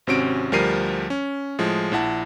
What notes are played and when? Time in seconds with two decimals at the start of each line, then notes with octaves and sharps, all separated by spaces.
0.07 G#1 C3 C4 C#4 F#4 D7
0.52 D2 F3 G3 A#4 C7 D#7
1.10 C#4
1.58 A2 F3 G#3
1.92 A#1 E4 F#5 A5